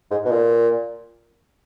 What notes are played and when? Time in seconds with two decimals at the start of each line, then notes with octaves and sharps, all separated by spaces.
0.11 G#2
0.25 B2
0.31 A#2